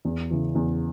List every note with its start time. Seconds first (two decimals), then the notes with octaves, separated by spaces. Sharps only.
0.05 E2
0.31 C#3 E3
0.55 E2